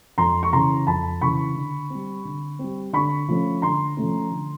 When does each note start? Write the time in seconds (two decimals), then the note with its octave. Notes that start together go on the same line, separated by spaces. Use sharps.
0.18 F2 A#5 C6
0.43 C#6
0.53 C#3 E3 A#5 C6
0.87 F2 A5 B5
1.21 C#3 E3 B5 C#6
1.56 D3
1.90 G3 C4
2.25 D3
2.59 G3 C4
2.93 D3 B5 C#6
3.28 F3 A3 C#4
3.62 D3 A#5 C6
3.97 F3 A3 C#4
4.31 D3